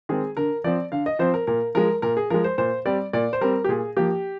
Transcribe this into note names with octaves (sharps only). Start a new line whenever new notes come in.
D#3 G#3 C4 G#4
D3 A#4
F3 C4 D5
D3 F5
D#5
F3 C4 C5
A#4
A#2 A#4
F3 G#3 A#4
A#2 A#4
G#4
F3 G#3 A#4
C5
A#2 C5
G3 C4 D5
A#2 D5
C5
G3 C4 A#4
G4
A#2 G#4
F3 A#3 G4